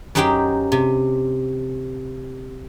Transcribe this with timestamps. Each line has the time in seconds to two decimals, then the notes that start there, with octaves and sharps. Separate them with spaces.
0.15 F#2 F#3 D#4 G4 C5 G5
0.72 C3